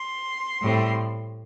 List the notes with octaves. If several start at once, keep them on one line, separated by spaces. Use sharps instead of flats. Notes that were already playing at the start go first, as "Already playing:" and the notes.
Already playing: C6
A2 G3 C4